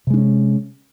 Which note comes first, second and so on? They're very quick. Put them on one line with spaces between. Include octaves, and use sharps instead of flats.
C3 G#3 D4 C#4